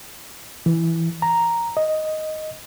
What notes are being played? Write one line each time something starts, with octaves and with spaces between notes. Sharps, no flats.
E3
A#5
D#5